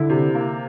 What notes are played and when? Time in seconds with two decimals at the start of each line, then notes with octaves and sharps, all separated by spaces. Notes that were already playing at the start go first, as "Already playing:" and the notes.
Already playing: D3 E4
0.09 C3
0.35 A#3